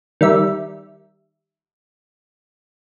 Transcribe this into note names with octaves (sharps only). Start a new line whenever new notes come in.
D#3 G3 E5